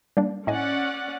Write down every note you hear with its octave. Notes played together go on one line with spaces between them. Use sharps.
G3 A#3 D4
A2 C#4 D5 D#5 F#5 G#5